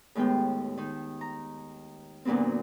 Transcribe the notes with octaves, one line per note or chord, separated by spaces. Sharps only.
D#2 A2 G#3 B3 G5
D#3 D#4
A#5
D2 A#2 F#3 B3 C4